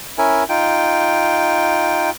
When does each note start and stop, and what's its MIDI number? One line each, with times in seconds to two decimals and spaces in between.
0.18 0.44 61
0.18 0.44 64
0.18 0.44 70
0.18 0.44 80
0.49 2.10 63
0.49 2.10 65
0.49 2.10 79